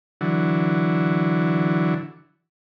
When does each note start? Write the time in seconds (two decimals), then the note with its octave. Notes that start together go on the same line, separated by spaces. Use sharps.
0.21 D3 E3 F#3